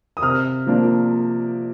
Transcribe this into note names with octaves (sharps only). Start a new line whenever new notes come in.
D#6
C3 F6
F3 A#3 D4